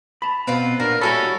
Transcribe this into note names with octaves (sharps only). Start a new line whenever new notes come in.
A5 B5
B2 B3 C4 F4 B4
A#2 D4 F#4 A#4
G3 E4 F#4 A4 C#5 G#5 B5